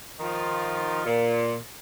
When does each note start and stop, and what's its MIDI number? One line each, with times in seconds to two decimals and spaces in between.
0.20 1.02 51
0.20 1.02 53
0.20 1.02 63
0.20 1.02 65
1.06 1.56 46